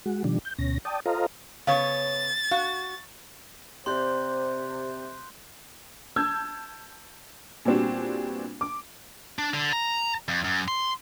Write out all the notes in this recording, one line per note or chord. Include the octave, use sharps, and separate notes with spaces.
G#3 F#4
B2 D#3 F3 G3 D4
G6
D2 B2 C#4 A#6
D5 G5 A5 D#6
F4 A4 C5 D#5 F5 A#5
C#3 B3 C#5 F5 A6
F#4 F5
C3 C4 G4 C5 D5 C6 F#6 G6
A5 E6 G6 G#6
A#2 G3 B3 C4 D4 F#4
D6
D4
D3
A#5
F2
F#2
C6